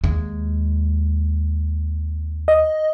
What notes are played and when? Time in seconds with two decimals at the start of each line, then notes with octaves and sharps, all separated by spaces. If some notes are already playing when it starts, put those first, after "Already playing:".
0.04 D#2 G#3
2.48 D#5